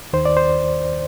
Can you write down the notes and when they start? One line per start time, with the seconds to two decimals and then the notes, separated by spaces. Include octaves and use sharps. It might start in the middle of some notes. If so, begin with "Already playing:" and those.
0.13 D#2 D#3 C5
0.25 D5
0.37 C5